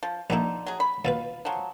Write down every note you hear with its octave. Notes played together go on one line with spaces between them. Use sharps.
F3
A#1 A#2 D3 D#4 E4
F#3 G#4
B5
D#2 B2 F4 B4
F3 F#3